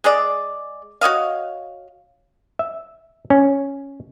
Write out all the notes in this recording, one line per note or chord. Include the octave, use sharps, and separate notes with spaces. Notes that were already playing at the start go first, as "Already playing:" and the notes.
G#3 G#4 D5
F#4 C#5 D#5 F5
E5
C#4